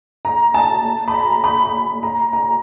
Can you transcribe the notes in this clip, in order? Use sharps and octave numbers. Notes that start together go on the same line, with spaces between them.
A#5
A5
B5
A#5
B5
B5
A#5
A#5